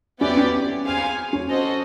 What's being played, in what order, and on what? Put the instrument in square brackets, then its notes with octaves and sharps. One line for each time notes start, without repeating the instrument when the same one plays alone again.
[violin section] B3 E4 G4 B4 D5 [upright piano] C#4
[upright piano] C#4
[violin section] G#4 C5 F5 G#5
[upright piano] C#4
[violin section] F#4 A4 C5 D#5